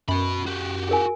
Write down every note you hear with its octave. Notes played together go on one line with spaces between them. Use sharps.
F#2 F#4 B5
F#4 G4
G#4 A#4 G#5